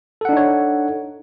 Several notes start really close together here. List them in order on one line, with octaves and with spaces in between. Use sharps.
A4 F#5 D4 D#4 C#5